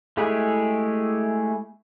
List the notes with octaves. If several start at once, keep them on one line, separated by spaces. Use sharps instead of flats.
G#3 A3 E4 G4 G#4